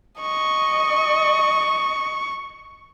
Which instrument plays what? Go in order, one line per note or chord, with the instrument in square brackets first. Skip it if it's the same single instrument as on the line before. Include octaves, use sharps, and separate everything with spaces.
[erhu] D#5 [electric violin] C#6